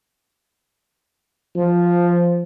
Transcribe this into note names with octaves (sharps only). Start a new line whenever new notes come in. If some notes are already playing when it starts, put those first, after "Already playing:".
F3